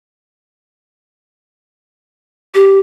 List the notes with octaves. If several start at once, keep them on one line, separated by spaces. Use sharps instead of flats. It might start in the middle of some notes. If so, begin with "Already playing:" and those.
G4